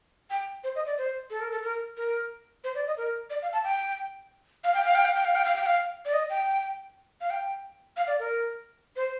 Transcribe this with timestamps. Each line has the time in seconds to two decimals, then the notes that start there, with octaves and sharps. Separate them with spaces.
0.30 G5
0.64 C5
0.76 D#5
0.86 D5
0.98 C5
1.30 A4
1.41 A#4
1.51 A4
1.64 A#4
1.97 A#4
2.64 C5
2.75 D5
2.87 D#5
2.97 A#4
3.30 D5
3.42 F5
3.53 A5
3.64 G5
4.64 F5
4.74 G5
4.85 F5
4.95 G5
5.05 F5
5.14 G5
5.25 F5
5.36 G5
5.45 F5
5.56 G5
5.66 F5
6.05 D5
6.13 D#5
6.30 G5
7.21 F5
7.30 G5
7.97 F5
8.07 D5
8.19 A#4
8.96 C5